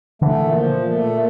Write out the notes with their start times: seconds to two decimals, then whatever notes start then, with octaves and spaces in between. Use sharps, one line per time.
0.22 D3 E3 A3
0.39 A#2
0.55 F3
0.72 A#2
0.90 A3
1.06 A#2